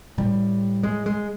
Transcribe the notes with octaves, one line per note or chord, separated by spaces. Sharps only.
A2 G3
G#3
G#3